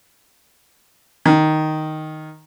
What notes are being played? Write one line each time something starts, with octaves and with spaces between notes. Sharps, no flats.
D#3